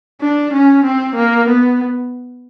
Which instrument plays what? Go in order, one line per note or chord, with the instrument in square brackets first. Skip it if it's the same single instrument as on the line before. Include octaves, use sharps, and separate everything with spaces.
[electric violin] D4
C#4
C4
A#3
B3